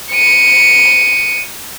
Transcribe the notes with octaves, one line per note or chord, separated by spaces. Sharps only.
C#7 D#7